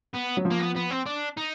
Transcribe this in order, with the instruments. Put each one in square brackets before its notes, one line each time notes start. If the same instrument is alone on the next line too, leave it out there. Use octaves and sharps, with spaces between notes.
[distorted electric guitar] B3
[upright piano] F#3
F3
[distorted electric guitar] A#3
B3
B3
C4
D4
D#4